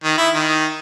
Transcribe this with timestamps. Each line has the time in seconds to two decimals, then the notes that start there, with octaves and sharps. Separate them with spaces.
0.04 D#3
0.18 E4
0.34 D#3